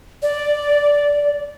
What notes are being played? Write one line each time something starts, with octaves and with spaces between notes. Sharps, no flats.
D5